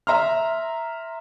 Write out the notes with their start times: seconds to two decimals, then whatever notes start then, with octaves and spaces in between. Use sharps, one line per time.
0.07 E5 A#5 C6 F6